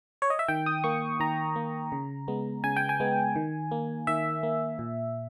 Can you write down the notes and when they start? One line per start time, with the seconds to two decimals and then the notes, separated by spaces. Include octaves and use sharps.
0.22 C#5
0.30 D#5
0.39 E5
0.48 D#3 G5
0.66 D#6
0.84 A#3 C#6
1.20 D#3 A#5
1.56 A#3
1.92 C#3
2.28 G#3 B3
2.64 C#3 G#5
2.76 G5
2.89 G#5
3.00 G#3 B3
3.36 D#3
3.71 A#3
4.07 D#3 E5
4.43 A#3
4.79 A#2